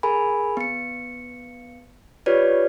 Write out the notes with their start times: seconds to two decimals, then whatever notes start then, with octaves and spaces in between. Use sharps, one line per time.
0.03 G#4 A#4 G#5 B5
0.57 B3 C#7
2.26 F4 G4 B4 C#5 D5